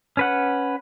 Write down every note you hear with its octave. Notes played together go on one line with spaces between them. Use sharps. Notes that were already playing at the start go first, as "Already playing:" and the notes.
C#4 B4 F#5